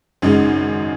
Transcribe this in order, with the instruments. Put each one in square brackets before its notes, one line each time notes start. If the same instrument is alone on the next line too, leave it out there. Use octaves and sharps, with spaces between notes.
[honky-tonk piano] G#1 F#2 C#3 G#3 D#4